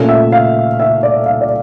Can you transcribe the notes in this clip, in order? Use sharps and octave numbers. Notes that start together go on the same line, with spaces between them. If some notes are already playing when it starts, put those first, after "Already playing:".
Already playing: A#2 A3 C#4
E5
F5
E5
D5
F5
D5